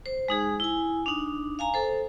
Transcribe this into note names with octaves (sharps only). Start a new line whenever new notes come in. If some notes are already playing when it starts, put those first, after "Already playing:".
C5
G#3 D#4 G#4
E4 G#5
D4 D#4
F5 G#5 A#5
A4 C5